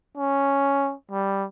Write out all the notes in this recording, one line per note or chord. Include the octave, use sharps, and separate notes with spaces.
C#4
G3